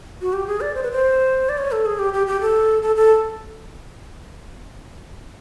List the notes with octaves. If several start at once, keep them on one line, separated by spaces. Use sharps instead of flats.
F#4
G4
G#4
D5
C5
B4
C5
D5
C#5
A4
G#4
G4
G4
G4
A4
A4
A4